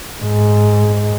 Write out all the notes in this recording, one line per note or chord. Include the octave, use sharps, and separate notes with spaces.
G#2